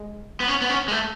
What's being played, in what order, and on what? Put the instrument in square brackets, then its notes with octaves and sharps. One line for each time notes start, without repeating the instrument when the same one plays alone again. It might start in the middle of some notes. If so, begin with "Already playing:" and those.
Already playing: [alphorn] G#3
[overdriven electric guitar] B3
C#4
B3
C#4
G#3
A3